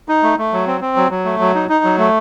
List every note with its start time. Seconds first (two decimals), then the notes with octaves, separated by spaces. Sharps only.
0.09 D#4
0.23 A3
0.38 A3
0.53 F#3
0.67 C4
0.81 C4
0.96 F#3
1.11 F#3
1.25 A3
1.40 F#3
1.55 D#4
1.69 D#4
1.84 F#3
1.98 A3